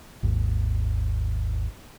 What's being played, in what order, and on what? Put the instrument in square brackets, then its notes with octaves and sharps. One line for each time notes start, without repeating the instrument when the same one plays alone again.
[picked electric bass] G#1 D#2